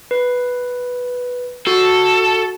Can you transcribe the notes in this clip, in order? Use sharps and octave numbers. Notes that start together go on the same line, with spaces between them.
B4
F#4 A4